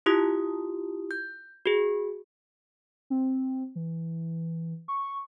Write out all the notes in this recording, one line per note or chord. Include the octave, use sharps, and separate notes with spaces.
E4 F4 G4 D#6
G6
F#4 G#4
C4
E3
C#6